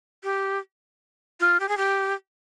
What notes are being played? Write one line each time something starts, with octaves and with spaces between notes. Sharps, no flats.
G4
F4
G4
G#4
G4